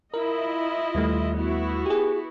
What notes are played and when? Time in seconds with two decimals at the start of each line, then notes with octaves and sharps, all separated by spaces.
0.14 E4 F4 A#4 D#5
0.95 D#2 G3 A3
1.37 B3 E4 F#4
1.86 G4 G#4